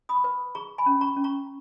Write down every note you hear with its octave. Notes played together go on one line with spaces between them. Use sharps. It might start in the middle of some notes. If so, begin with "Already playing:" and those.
B5 D#6
B4
G#4 A#5 C#6
G#5 B5
C#4
A#5 C#6
C#4
A#5 C#6